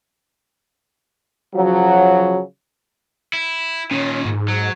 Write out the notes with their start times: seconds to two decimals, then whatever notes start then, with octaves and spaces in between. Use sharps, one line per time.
1.54 C#3 F3 F#3
3.33 E4
3.91 A#2 D#3 C#4
4.25 G#2
4.48 F#3